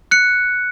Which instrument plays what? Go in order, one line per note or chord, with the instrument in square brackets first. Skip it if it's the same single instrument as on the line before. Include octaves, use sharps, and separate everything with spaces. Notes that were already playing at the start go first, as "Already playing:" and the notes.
[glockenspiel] F#6 C#7